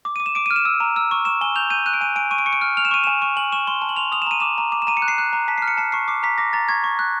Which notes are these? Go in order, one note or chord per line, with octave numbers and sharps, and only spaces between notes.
D6
D#7
D6
E7
D6 D7
D#7
F6
E7
E6
A#5
E6
C#6
C#6 E7
G#5 G7
G6 F7
G6 D#7
F#6 D#7
D7
G#5 D#7
G#5 D7
C#6 D#7
D7
C#6 C#7
D7
F6
F6 F7
E7
C#6 D#7
G#5 E7
C#6
G#5 F#7
C#6 E7
C6 G7
A5
F#7
C6 F7
D#6 F7
E7
A#5 D#7
D6 E7
A#5
D6
E7
A#5 D#7
C#7
F#6
C7
F#6
A#5
A5 B6
C7
F6
C#7
A5 C7
C#6 C7
D6 C7
A#5 B6
D6 A#6
A#5 A6
C#6 G#6
C#6
F#6